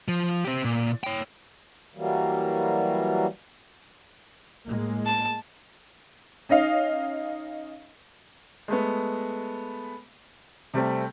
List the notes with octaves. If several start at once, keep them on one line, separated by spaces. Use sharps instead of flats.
F3
C4 G4
A#2
C#5 G5
E3 F#3 G3 A#3
A2 G#3 A#3
A5
C#4 D#4 D#5 F5
G#3 A3 B3
C3 G3 A3 C4